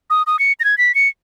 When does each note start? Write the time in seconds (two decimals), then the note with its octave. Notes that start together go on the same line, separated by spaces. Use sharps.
0.10 D#6
0.27 D#6
0.39 C#7
0.60 A#6
0.64 G#6
0.78 B6
0.95 C#7